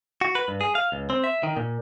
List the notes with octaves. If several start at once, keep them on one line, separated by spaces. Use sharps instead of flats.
F#4
B4
G2
G#4
F5
C#2
C4
E5
D#3
A#2